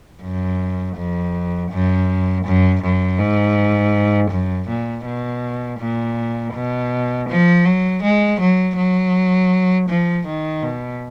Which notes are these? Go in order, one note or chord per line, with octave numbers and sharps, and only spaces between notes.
F#2
F2
F#2
F#2
F#2
G#2
F#2
A#2
B2
A#2
B2
F3
F#3
G#3
F#3
F#3
F3
D#3
B2